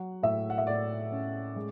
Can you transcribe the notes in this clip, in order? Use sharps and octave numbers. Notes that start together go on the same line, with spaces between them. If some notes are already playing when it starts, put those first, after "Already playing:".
Already playing: F#3 F#5
A2 E5
F#5
E5
A2 D5
C#4
G#3